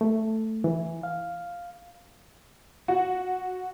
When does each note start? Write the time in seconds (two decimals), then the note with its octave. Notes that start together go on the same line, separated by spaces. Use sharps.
0.01 A3
0.64 E3
1.03 F5
2.88 F#4